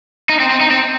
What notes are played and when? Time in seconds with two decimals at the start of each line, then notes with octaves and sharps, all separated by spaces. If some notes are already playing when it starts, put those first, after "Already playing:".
0.29 D#4
0.40 C4
0.51 C4
0.61 D#4
0.71 C4